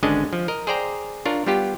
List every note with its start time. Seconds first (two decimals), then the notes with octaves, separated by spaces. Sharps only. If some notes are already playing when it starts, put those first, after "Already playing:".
0.03 G#1 D3 G#3 C#4 D4 D#5
0.33 F3
0.48 A#4 D#5
0.67 G#4 C5 D5 G5 A#5
1.25 D4 F4 A#4 C#5
1.47 G3 B3 F4 G4